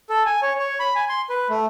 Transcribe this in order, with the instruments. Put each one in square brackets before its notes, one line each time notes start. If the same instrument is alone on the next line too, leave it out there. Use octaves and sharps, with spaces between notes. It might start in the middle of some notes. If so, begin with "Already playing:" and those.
[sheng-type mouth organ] A4
G#5
C#5
C#5
B5
G#5
C6
B4
A3